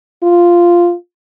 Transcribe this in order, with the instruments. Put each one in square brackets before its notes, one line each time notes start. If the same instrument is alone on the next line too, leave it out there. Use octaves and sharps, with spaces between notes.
[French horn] F4